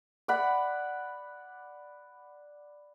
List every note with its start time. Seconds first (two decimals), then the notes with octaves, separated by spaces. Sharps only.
0.28 D5 F#5 B5